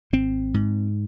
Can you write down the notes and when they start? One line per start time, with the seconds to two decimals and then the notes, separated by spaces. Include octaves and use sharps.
0.13 G#1 C4
0.54 G#2